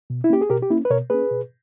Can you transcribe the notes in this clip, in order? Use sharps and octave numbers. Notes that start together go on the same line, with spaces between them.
B2
E4
A#3 C#4 G4
G#4
B2 G4 A#4
G4
A#3 C#4 E4
B4
B2 A#4 C#5
A#3 C#4 G#4 B4
B2